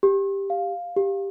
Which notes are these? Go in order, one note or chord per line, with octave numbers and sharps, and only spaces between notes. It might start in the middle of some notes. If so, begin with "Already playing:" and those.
G4
F5
G4